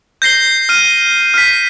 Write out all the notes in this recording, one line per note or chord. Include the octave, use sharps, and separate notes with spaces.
G6 A#6 C7 G7
F6 D#7
F6 B6